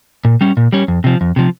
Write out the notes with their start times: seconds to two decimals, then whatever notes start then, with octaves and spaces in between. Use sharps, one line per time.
0.25 A#2
0.41 G3 C#4
0.57 A#2
0.73 G3 C#4
0.88 F2
1.04 C3 F3
1.21 F2
1.36 C3 F3